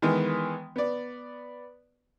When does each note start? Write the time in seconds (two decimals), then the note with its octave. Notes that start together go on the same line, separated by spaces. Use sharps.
0.02 D#3 E3 G#3 B3
0.76 B3 D5